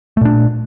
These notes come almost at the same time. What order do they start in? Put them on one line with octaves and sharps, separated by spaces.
A3 A#2 D4